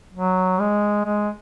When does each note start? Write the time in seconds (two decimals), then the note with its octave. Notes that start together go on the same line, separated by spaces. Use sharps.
0.14 F#3
0.59 G#3
1.05 G#3